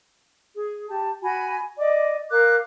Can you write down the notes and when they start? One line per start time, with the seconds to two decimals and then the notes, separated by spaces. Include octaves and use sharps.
0.55 G#4
0.89 G4 A5
1.22 F#4 G#5 B5
1.79 D5 D#5 D6
2.30 A#4 F5 D6 F#6